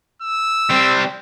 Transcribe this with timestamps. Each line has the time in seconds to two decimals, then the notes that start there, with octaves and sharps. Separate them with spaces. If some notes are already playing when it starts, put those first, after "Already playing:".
0.22 E6
0.70 G3 C4